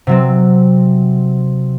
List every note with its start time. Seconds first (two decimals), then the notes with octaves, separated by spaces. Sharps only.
0.07 C3 F#3 C4